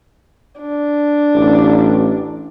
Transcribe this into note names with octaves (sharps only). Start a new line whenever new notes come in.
D4
A1